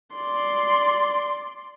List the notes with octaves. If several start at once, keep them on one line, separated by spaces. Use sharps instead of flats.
D5 C6